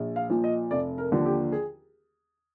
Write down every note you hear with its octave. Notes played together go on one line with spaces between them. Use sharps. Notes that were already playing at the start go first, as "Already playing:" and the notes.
Already playing: A#1
F5
A#2 F3
D#5
F1 D5
A#4
D#2 D3 F3
G4
G#4